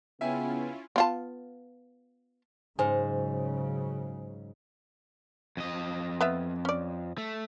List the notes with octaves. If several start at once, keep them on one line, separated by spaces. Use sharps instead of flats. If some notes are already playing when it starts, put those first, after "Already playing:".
C#3 B3 C#4 E4 F4 E5 G5 G#5
B3 F4 A5
G#2 C#3 F#3 C5 G#5
F2 D#5
B3 F4 E5
C#4 D5
A3